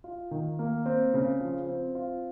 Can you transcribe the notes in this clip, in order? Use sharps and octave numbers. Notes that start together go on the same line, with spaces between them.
F4
D#3
A#3
C4
C#3
F3
C4
F4